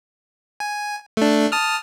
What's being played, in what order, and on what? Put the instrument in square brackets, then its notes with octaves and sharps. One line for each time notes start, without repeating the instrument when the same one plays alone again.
[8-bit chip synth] G#5
A3 D4
A5 D#6 F6